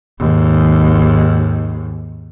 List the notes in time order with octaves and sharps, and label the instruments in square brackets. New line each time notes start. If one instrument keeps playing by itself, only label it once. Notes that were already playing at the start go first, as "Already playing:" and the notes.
[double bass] D#2 G#2